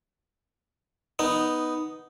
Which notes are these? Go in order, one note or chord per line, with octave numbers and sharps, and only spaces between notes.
B3 D#4